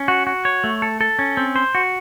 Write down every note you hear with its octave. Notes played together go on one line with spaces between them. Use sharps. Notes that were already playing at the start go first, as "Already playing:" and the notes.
Already playing: C#4
F#4
F#4
C#5
A3
A4
A4
C#4
C4
C5
F#4